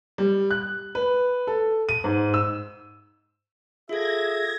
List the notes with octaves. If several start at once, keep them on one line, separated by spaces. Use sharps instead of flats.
G3
F#6
B4
A4
D#7
G#2
E6
F4 G#4 A4 E5 G#6 A#6